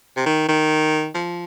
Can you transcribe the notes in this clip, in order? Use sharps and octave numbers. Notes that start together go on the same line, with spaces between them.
C3
D#3
D#3
F3